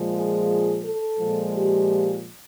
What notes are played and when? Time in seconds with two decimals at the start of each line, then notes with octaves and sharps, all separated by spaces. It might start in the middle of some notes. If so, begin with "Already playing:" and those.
Already playing: A#2 F3 G#3
0.13 G#4
0.84 A4
1.18 A#2 F3 G#3
1.53 G4